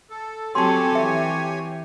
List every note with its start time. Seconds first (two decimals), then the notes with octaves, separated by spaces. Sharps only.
0.10 A4
0.55 F#3 C4 G4 A4 C#5 G#5 A5 C6
0.95 E3 E5